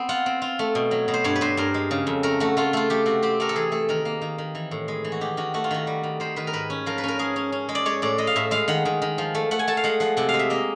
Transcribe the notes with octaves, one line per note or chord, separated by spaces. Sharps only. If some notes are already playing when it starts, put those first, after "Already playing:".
Already playing: B3 C4
F4 F#5
C4
F4
A3
B2
F#3
B2
C5
G2 C#5
B4
G2 C5
G2 A#4
G#3
C#3
F2
A3 A#4
A3 F#4
A3 F4
A3 F4
A3 G4
C3 F#4
C4 G4
A3 A#4
A4
E3 G#4
A3 A4
D#3 A#4
A#3
D#3
D#3
E3
A2
G#3
E3
F#4
D#3 G4
D#3 F#4
A3 F#4
F4
D#3 F#4
G3
D#3
D#3 C5
D#3 B4
A#4
G#2 B4
C#4
F3 A#4
B4
C#4 A#4
C#4 G#4
C#4
C#4
G#3
D5
G#3 C#5
A2 D5
G#3 D#5
F5
A2 E5
G#3 F5
D#3 F#5
D#3
D#3
F3
A3
A3 F#5
G#5
A3 A5
F5
G#3 F#5
F3 F#5
C3 F#5
F5
G#3
E5
A#3 D#5